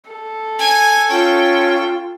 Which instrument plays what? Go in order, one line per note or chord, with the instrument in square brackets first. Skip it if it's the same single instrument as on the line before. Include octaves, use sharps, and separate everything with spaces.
[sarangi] A4
[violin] G#5
[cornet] C#4 [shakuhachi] F4 [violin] G5